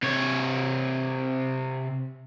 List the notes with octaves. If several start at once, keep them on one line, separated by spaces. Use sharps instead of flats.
C3 C#5